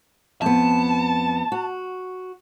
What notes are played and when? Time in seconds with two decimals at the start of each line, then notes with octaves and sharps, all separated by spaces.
0.42 F2 B3 A5
1.52 F#4